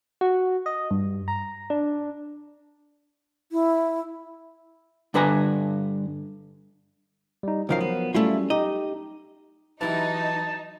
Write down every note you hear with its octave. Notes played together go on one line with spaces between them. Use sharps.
F#4
D#5
G2
A#5
D4
E4
G2 D3 B4 G#5 A#5
G3 D#4
C#2 D#3 F3 F#3 A#4 F5
B3
F#3 G3 A3 C#4 E4 F4
D#4 G4 D#5
E3 F#3 D#4 E4 G4 A5